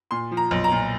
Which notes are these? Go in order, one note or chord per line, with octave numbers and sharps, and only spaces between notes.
A#2 C6
F3
A#5
B1
A#5
A#2